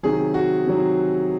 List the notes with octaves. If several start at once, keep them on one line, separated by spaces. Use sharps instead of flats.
C3 D#3 F#3 G#4
F#4
C3 D#3 F#3